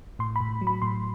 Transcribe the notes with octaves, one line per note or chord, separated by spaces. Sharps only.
A2 C6
B5
A2
F#3
B5
A2 C6